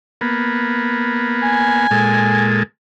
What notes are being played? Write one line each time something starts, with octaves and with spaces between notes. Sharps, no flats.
A#3 B3
G#5
A#2 G#3 A4